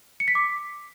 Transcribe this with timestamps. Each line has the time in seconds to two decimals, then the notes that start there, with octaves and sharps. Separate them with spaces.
0.20 C#7
0.28 B6
0.35 D6